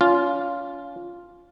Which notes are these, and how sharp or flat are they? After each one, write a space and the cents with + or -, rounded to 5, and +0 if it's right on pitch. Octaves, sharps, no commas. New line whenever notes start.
C#4 +35 F4 +0